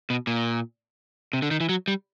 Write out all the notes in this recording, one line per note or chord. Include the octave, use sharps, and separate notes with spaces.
B2
A#2
C3
D3
D#3
E3
F#3
G3